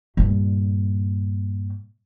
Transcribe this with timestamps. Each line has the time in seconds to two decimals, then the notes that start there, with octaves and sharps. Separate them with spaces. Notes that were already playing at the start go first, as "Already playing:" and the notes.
0.17 G2 A#2